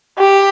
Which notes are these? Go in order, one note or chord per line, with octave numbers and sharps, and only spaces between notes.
G4